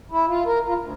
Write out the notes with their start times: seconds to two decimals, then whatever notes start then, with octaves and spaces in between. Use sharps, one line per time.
0.11 E4
0.28 F4
0.46 A#4
0.66 F4
0.79 D2